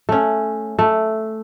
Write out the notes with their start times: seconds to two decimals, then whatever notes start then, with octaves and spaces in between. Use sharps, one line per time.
0.09 A3 C#4
0.79 A3